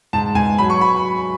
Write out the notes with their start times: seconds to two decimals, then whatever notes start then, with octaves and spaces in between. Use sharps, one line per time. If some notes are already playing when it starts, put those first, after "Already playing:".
0.13 G#2 A5
0.35 G#2 G#5
0.58 F#3 B5
0.70 C#6
0.81 B5